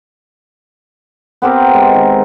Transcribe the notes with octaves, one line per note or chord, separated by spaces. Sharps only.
B3 C4 G4 A#4
G#3
D#3